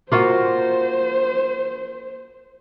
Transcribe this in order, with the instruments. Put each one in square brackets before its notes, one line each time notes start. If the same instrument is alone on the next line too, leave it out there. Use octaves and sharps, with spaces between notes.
[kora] A#3 F4 F#4 [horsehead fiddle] C5